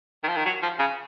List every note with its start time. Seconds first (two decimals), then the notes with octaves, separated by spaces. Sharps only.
0.23 D#3
0.28 F3
0.36 D#3
0.45 F#3
0.62 F3
0.79 C#3